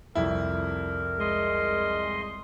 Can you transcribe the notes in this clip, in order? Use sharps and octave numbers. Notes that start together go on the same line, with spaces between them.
C2 F2 E4 A#4
G#3 D#5 C6